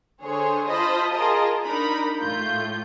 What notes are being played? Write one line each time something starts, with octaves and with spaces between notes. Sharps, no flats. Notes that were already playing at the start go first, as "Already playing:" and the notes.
D3 G#4 C5 C#5
F4 C5 D#5 A5 B5 D#6
F4 G#4 A#4 D#5 A5
D4 D#4 A#4 A#5 B5
A2 A3 F4 G6